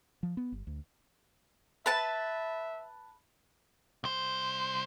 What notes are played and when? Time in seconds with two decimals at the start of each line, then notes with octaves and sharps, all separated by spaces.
0.23 F3
0.37 B3
0.52 G1
0.67 D2
1.86 B4 E5 A5
4.04 C2 C5